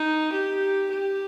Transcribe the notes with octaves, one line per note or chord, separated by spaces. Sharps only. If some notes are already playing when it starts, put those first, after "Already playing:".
Already playing: D#4
G4
G4